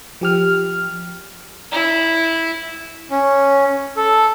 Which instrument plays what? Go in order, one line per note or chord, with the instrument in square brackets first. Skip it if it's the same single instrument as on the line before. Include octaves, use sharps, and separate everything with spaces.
[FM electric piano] F3 G4 F6
[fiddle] E4
[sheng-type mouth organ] C#4
A4